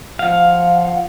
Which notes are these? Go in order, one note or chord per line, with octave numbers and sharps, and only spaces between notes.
F3 F5 F#5